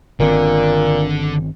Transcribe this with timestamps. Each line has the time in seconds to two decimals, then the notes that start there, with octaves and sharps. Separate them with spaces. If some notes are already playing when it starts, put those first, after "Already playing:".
0.20 G1 A#2 D3 D#3 C4